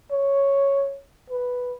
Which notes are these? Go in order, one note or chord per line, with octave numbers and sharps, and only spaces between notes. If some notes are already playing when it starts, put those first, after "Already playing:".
C#5
B4